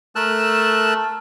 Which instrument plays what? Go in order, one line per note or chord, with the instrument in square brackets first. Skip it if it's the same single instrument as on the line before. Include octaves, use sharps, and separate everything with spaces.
[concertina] A3 A#4 A5 E6 F#6